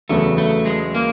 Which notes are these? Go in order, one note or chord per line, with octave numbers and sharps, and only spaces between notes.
E2 C#3 F#3 A3 B3
A3
G#3
A#3